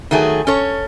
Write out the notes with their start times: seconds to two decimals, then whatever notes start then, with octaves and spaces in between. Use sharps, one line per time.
0.11 D#3 F#3 A3 G#4
0.47 C#4 A4 C#5